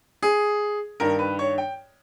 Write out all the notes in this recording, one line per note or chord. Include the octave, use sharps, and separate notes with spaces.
G#4
G2 D#3 A#4
B4
C#5
G5